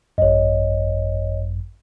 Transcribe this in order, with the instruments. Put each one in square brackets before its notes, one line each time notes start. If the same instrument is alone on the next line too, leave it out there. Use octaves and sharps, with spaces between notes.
[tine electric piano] G#1 F#2 [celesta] C#5 D#5